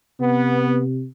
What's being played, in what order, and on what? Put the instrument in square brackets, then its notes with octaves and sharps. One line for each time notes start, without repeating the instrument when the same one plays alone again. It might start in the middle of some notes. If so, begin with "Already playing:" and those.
[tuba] C3 [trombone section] B3